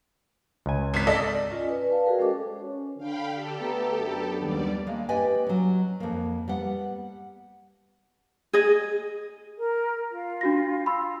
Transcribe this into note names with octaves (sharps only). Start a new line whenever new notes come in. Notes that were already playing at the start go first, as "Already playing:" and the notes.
C#2 G#5
G#1 B6
A4 D5 D#5
C#4 F4 D5 D#5 G#5
B4 D5
B4 F5 A5
F#4 G#4 A#4 G5
G#3 C#4 A4 C5 D#5 D6
C#4
D3 F5 G5 B5
G4 A4
A3 B3 A#5
F#2 B3 D4
D#2 G3 D5
G#3 A#3
G4 B4 D5 D#5 G5 G#5
F#3 C#4
F2 A#3
G3 B3 F#5
G#4 D#5
A#4
F4
D4 F#4 A#6
B5 C6 E6